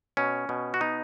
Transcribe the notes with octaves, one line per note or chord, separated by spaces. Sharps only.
B2 C#4
B2
F#4
B3 D#4